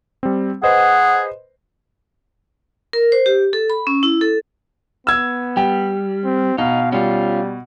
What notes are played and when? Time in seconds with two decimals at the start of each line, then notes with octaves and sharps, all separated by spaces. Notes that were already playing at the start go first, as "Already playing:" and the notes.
0.23 G3 C4
0.63 G#4 B4 C5 D#5 F#5
2.93 A#4
3.12 C5
3.26 G4
3.53 A4
3.70 B5
3.87 C#4
4.03 E4
4.21 A4
5.07 B3 E6 G#6
5.57 G3 G5
6.25 C4
6.58 B2 D#4 F5
6.92 G3 C#4 F4